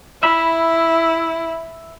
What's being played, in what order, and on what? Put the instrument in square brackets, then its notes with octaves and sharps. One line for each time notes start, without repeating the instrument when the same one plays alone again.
[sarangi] E4 [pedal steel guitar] E5 B5